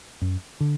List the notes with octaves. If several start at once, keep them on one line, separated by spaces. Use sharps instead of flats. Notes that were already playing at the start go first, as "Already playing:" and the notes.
F#2
D3